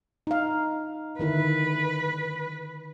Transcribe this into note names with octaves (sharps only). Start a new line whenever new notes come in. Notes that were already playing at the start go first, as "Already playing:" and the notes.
D#4 F5
D3 D#3 E4 B4